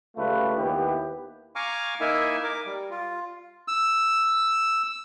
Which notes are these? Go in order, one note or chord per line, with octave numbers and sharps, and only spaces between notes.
C#2 G3 A3 F4 B4
D#2 B3 E4 G4 B4
F5 G#5 A#5 C#6 D6 F6
A#3 D#4 E4 A#4 E5 G#5
A#4 D6
G3
F4
E6